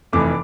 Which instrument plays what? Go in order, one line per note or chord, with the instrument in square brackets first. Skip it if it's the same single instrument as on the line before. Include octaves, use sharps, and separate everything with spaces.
[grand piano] F1 F2 E3 A3 D6